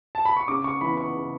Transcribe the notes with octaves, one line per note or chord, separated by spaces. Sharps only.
A5
B5
C#6
C#3 D6
C#6
E3 B3 B5
C#6
C#3